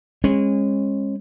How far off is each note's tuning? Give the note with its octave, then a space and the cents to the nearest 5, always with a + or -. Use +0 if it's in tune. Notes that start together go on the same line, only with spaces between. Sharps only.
G#3 -25 C#4 -35